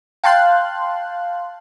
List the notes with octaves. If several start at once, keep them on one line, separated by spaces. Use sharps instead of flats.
F5 G5 A5 C6 F#6